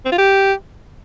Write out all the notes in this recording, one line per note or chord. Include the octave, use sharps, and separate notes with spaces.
C4
F4
G4